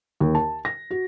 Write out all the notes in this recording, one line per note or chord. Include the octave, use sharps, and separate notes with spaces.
D#2
A5
A#6
F#4